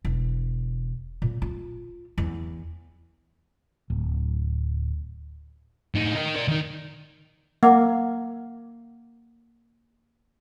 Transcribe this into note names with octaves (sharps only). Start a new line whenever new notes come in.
E1
A#2
F4
E2
D1
A2 D#4
D#4 A#4
A#4 D5
D#3 D#4
A#3 F#5 D6